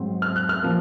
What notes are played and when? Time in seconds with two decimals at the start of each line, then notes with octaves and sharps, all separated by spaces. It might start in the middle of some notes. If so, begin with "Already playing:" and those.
Already playing: G#2 F#3 C4
0.22 F6
0.36 F#6
0.49 F6
0.63 C3 F3 A#3